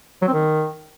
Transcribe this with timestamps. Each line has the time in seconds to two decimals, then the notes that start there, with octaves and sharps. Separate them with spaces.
0.22 F#3
0.27 C4
0.33 D#3